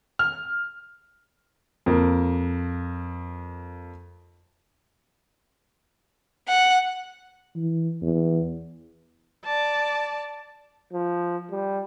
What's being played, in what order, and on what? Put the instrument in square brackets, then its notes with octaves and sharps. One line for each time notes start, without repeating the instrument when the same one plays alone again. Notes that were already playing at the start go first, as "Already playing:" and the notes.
[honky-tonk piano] F6
[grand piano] F2 A#3
[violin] F#5
[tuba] E3
E2
[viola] D5 A5
[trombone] F3
G3